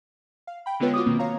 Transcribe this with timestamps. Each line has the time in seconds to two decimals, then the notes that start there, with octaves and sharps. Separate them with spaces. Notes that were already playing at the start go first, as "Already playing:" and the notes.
0.47 F5
0.66 G5 B5
0.80 D3 G#3 B3 F4 B4 C#5
0.93 F4 F#4 D6 D#6
1.06 B2 D#3 A#3 C4
1.19 C#5 F5 A#5